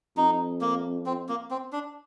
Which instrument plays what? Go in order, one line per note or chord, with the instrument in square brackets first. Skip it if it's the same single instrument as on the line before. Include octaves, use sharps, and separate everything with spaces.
[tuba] F2 [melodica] D#4
[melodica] A#3
C4
A#3
C4
D4